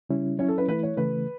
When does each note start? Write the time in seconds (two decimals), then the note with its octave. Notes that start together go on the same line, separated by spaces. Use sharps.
0.09 C#3 G3 C#4 E4
0.39 F#3 C#4 E4 C#5
0.48 A4
0.58 B4
0.68 E3 A3 E4 B4
0.83 C#5
0.97 C#3 E3 A3 B4